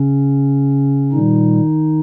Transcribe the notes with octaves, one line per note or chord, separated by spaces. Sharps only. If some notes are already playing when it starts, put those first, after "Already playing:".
Already playing: C#3 C#4
A#2 D#3 G3 D#4